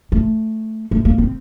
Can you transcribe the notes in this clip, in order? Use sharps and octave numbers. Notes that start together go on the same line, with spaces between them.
A3
A3
A#3
C4